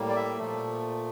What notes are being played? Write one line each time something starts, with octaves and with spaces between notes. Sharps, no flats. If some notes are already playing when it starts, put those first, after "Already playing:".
Already playing: A2 G3 A#3
D5
E5
A#2 F3 A3